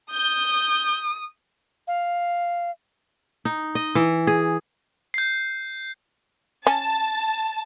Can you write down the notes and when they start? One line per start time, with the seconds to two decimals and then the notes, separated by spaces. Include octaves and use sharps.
0.13 D#6 G6
1.88 F5
3.45 D#4
3.75 D#5
3.95 E3
4.27 G#4
5.14 G6 C7
6.67 C#4 A5